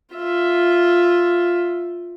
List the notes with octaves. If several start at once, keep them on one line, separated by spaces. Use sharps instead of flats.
F4 E5